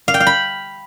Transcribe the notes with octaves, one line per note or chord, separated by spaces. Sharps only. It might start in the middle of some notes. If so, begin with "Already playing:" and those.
F5
G5
F5
B5